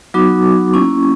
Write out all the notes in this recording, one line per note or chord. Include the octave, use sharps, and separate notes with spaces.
F#3 B3 D#4 F#4 D6
A#3 C#4 E4 C#6